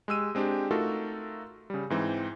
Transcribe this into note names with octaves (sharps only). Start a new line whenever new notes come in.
G#3 G4 E6 D#7
G#3 C4 D4 G4
A3 D#4 F4 F#4 A4 A#4
C#3 G3
G#2 E3 C4